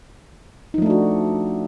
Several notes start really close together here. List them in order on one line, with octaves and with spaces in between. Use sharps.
D#4 F3 A3 D4 F#4